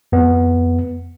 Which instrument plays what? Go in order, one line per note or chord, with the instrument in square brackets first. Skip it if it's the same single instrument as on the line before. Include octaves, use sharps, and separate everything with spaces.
[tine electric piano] F2 B3